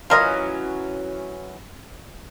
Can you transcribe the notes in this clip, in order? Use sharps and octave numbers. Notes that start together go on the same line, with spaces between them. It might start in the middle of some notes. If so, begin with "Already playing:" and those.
E3 F#3 C#4 F4 A#4 D#5